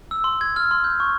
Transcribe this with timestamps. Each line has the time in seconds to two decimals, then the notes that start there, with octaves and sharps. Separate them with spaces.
0.11 E6
0.24 C6
0.41 G#6
0.56 F6
0.71 C6
0.84 G6
1.00 C#6